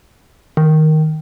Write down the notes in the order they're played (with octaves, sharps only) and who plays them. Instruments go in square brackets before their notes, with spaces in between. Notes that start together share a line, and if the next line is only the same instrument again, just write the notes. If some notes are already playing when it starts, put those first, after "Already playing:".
[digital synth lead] D#3